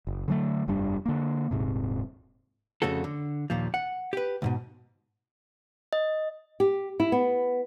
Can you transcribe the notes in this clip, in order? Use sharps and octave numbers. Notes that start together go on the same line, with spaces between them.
F#1
D3 F#3 A3
F1 G2 G3 D4
D3 A#3
D#1 G#2 C3
F2 C#3 A3 F#4 A4
D3
D#2 A#2 F3
F#5
G4 B4
C#2 G#2 B2
D#5
G4
E4
B3